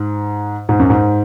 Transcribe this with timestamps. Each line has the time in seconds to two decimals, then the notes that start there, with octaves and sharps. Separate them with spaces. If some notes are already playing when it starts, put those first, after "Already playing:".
Already playing: G#2
0.69 G#2
0.80 F#2
0.90 G#2